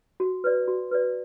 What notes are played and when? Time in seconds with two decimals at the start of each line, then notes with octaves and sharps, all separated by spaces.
0.20 F#4
0.44 B4 D5
0.68 F#4
0.91 B4 D5